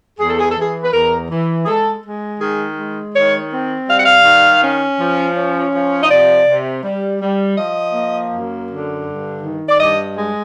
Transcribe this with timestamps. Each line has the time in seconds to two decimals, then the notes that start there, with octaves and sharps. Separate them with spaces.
0.19 E2 G#4
0.29 A4
0.40 G#4
0.51 A4
0.57 E3 G#4
0.84 B4
0.93 E2 A#4
1.31 E3
1.63 G#4
1.67 G#3 A4
2.04 G#3
2.41 D#3 G#4
2.78 G#3
3.14 D#3 C#5
3.51 C4
3.88 G3 F5
3.97 F#5
4.05 F5
4.25 D#3
4.62 C#4
4.99 F3
5.36 C#4
5.73 F3
6.03 D#5
6.10 C3 D5
6.47 C3
6.84 G3
7.21 G3
7.57 F3 D#5
7.94 A#3
8.31 F#2
8.68 D3
9.05 G2
9.42 D#3
9.69 D5
9.78 G2 D#5
10.16 G#3